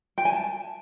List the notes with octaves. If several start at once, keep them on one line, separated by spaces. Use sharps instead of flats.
G5
G#5
A5